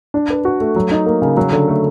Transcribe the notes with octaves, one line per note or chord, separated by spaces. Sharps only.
D4
B4
F#4
A3
F#3
D#4
A#3
C#3
F#3
D3
A3